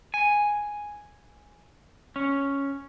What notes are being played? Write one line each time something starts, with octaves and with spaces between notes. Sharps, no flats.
G#5
C#4